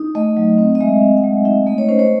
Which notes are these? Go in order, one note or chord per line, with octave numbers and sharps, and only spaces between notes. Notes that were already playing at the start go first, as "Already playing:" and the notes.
Already playing: D#4
A3 D#5
F#3
C4
D#5
G#3 E5
C4
F#5
G#3 E5
D#4 E5
A3 D#5
C#5
C#4 C5
C#5